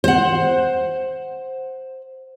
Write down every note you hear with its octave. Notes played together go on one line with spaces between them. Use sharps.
C5 F#5